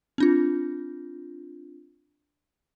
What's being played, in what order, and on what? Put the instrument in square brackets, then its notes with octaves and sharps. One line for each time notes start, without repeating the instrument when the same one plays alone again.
[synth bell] C4 D4 F4